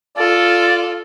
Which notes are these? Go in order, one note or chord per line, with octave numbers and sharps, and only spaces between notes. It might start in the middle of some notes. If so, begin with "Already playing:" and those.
F4 A4 D5